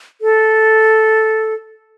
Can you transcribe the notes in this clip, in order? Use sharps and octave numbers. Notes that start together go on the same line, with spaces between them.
A4